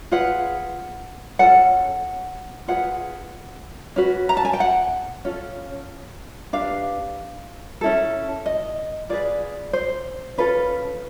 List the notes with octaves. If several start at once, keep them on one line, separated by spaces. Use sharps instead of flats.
F4 G#4 B4 F#5
C#4 F4 A4 F#5
F4 G#4 B4 F#5
C#4 F#4 B4
A#5
A5
G#5
G5
F#5
C#4 F4 A4
D4 G4 B4 F5
C#4 E4 A4
D#5
F4 G#4 B4 D5
C5
C#4 F4 A4 B4